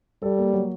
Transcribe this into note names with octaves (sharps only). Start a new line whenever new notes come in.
G3 A4
A#3
F#3